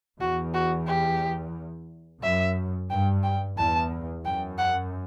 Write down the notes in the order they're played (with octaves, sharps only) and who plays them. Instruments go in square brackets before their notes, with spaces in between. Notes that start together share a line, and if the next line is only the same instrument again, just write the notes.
[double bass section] E2 [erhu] F#4
[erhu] F#4
G4
[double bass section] F#2 [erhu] E5
[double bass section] G2 [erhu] G5
[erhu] G5
[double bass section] E2 [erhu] A5
[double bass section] F#2 [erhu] G5
[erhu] F#5